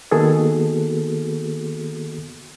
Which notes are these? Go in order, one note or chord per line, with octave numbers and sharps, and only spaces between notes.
D#3 A#3 B3 F#4 G#4 A4